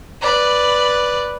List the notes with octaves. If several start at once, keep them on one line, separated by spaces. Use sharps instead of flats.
B4 D5